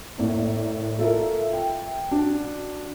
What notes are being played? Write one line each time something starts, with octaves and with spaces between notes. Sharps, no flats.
A2 A#3 D5
F4 A4 A#4 E5
G5
D4 F#4